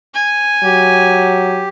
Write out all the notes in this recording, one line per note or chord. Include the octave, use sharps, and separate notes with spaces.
G#5
F#3 G4